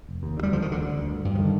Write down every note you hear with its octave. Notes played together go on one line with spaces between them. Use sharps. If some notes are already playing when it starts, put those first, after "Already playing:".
F1
D#2
D3
G3
D3 F3
D#3
D2 D3
D3
D2
G2
G2
F3
D3 D#3